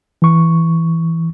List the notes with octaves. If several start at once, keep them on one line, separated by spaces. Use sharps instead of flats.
E3 C#6